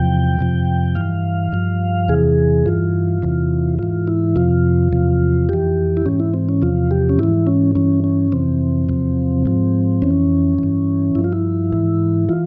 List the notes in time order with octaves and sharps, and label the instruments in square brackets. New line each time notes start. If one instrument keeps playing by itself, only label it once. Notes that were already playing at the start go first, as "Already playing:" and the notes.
Already playing: [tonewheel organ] E2 C3 F3 G5
F2 C3 F3
G2 E3 F5
G2 F3
E2 C3 E3 G#4
G2 E3 F4
E2 C3 E3
G#2 E3 F4
E4
F2 C3 F3 F4
E2 C3 F3
F2 E3 G4
E4
G#2 E3 C#4
E4
C4
C#4
E2 C3 F3 F4
G4
C#4
G#2 E3 E4
C#4
G2 E3 C#4
C#4
F2 C3 E3 C4
E2 C3 F3
G#2 F3
F2 E3 C#4
G2 E3
G2 F3 E4
F4
E4
G#2 E3
E3 F4